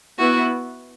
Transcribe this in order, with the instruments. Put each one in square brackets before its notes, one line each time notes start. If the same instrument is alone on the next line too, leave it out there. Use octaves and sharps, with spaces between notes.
[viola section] B3 E4 B4 [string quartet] F#4